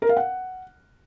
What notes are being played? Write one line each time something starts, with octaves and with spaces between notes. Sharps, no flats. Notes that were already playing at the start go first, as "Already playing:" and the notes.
A#4
F5
F#5